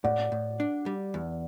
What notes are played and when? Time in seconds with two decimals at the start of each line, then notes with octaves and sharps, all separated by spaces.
0.04 A2 D5 F#5
0.32 A2
0.60 D4
0.86 G3
1.14 E2